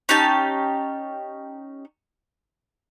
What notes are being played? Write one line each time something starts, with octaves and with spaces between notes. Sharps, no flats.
C#4 D#4 G4 A5